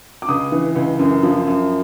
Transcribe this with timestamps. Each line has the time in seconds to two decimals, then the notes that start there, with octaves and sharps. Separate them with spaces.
0.22 D6
0.29 C#2 D#6
0.52 E3
0.76 C#2
0.99 F#2
1.23 F3
1.48 F#2